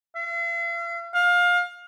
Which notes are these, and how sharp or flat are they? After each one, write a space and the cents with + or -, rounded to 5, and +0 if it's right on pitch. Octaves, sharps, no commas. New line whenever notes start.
F5 -45
F5 +25